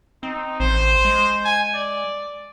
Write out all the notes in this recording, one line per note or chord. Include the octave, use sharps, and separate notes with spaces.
C4 D#4
A1 C5
G#3
G#5
D5